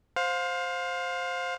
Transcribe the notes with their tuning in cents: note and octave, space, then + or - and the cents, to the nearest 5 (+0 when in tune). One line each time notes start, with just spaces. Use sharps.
C5 +0 F5 +25